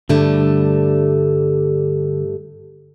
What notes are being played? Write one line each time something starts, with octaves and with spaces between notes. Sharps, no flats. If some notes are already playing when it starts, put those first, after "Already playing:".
G2 D3 G3 A3